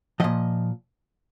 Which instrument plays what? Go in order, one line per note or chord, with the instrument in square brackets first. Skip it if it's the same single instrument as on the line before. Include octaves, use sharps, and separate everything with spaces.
[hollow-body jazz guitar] A#2 F3 D#5